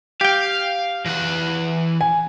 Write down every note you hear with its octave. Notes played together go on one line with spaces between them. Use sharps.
G4 F5 G5
E3 F#5
G#5